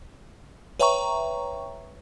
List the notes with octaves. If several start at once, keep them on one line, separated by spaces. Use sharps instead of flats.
B4 C#5 E5 G5 A#5 C#6